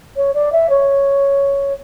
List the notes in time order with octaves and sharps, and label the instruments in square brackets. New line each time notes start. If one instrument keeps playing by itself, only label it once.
[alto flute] C#5
D5
E5
C#5